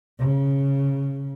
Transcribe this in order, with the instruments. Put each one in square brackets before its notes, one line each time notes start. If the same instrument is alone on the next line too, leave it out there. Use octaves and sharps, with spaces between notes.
[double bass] C#3